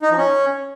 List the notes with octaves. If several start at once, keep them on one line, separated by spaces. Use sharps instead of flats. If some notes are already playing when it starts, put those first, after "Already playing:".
D#4
F3
C#4